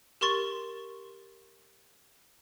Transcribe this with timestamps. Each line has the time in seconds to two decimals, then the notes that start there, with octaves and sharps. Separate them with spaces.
0.21 G4 A#4 C6 C#6 A6 G7